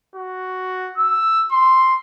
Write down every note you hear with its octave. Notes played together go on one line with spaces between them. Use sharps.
F#4
E6
C6